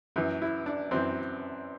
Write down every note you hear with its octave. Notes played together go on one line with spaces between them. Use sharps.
F#2 E3
E4
D4
F#2 E3 C4